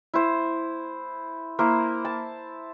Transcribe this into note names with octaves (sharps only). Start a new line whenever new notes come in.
E4 C5
A#3 E4 A#4 C5
A5